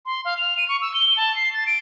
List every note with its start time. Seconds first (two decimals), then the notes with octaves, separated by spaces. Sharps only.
0.06 C6
0.25 F5
0.38 F7
0.57 D#7
0.68 C#6
0.81 E6
0.94 G7
1.17 A5
1.36 C7
1.54 A6
1.66 D7